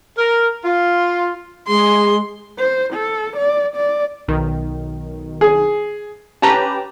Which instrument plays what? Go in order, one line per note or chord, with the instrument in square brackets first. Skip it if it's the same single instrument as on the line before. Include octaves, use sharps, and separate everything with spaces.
[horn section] A#4
F4
[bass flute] G#3 [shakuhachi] G#4 [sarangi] C6
[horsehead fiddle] C5
A4
D5
D5
[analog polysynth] B1 D#3
[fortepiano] G#4
[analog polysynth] C#4 G4 B4 [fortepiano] A5 A#5